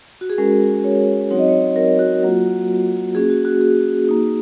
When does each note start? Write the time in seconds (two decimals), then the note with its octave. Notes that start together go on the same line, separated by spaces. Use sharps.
0.21 F#4
0.30 G#4
0.38 G#3 C#4 F#4 A#4
0.84 C#5
1.30 F#3 C4 D#4 F#4 C#5
1.39 D#5
1.48 C#5
1.76 A#4
1.99 F#4
2.23 F#3 A#3 F4
3.15 A#3 C#4 F#4 G#4
3.30 F#4
3.45 F#4
3.61 G#4
4.08 A#3 D#4 F#4